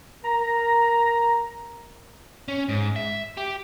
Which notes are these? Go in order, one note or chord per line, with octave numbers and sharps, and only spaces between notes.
A#4 A#5
C#4
G#2
E5
G4